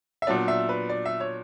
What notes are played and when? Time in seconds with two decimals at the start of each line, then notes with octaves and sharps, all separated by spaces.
0.22 E5
0.27 A#2 F#3 B3 D4 D5
0.48 E5
0.69 B4
0.89 D5
1.06 E5
1.20 C#5